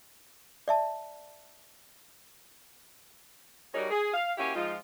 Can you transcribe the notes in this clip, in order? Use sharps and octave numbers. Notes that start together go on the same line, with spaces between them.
D5 E5 A5
G3 D#4 F#4 G#4 A#4 C#5
G#4
F5
A#3 C#4 E4 F#4 G4
F3 G#3 D#4 F4